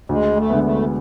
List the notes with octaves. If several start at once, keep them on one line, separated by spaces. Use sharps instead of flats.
D2 G#3
A3
D3 G#3 B3
A3